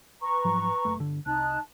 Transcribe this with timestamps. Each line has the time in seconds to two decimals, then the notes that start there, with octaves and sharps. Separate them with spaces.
0.22 B4 A#5 C#6
0.45 G#2 F3 F#3
0.85 F#1 A3
0.99 G1 D3
1.26 C2 D#4 A5 F#6